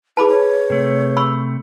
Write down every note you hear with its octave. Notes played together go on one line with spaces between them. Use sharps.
E4 G#4 B4 A5 B5 D6
C#5
C3 A3
B5 C#6 E6